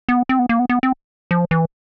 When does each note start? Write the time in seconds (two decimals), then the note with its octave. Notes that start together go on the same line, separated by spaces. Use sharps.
0.09 B3
0.29 C4
0.39 B3
0.49 A#3
0.59 B3
0.69 B3
0.83 C4
1.31 F3
1.51 E3